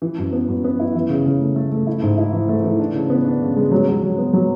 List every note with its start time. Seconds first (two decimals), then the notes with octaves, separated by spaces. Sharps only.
0.02 E3
0.18 F#2
0.33 B3
0.48 F#2
0.64 B3
0.80 E4
0.95 E3
1.10 C#3
1.26 C#3
1.41 A3
1.56 A3
1.72 A3
1.87 E4
2.02 G#2
2.18 E4
2.33 E3
2.49 A3
2.64 E3
2.80 D4
2.94 C#3
3.10 B3
3.25 D4
3.42 C#3
3.56 G#3
3.71 F#3
3.88 F#3
4.03 F#3
4.18 B3
4.33 F#3